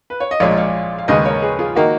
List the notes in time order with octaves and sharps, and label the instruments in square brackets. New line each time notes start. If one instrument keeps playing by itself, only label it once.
[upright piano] B4
C#5
D#5
[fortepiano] A#1 A#2 G#3 [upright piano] C#5 F5
[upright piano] C#5 F5
F5
[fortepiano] D#2 C#3 G#3 [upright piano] B4 D#5
[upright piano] A#4 C#5
G#4 B4
F4 G#4
[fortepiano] D#3 A#3 D#4 [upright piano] F#4 A#4